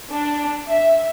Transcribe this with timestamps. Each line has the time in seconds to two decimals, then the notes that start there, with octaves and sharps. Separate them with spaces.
0.10 D4
0.67 E5